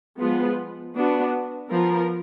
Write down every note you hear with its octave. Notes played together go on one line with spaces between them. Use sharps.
F3 G#3 B3 F4
B3 D4 F#4
F3 B3 F4 A#4